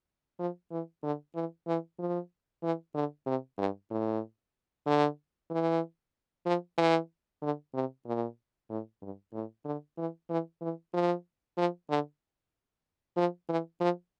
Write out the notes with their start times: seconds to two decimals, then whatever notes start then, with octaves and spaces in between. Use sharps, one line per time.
0.39 F3
0.71 E3
1.03 D3
1.35 E3
1.67 E3
1.99 F3
2.63 E3
2.94 D3
3.26 C3
3.58 G2
3.91 A2
4.86 D3
5.50 E3
6.46 F3
6.78 E3
7.42 D3
7.74 C3
8.06 A#2
8.70 A2
9.02 G2
9.33 A2
9.65 D3
9.98 E3
10.29 E3
10.61 E3
10.94 F3
11.57 F3
11.89 D3
13.16 F3
13.49 E3
13.80 F3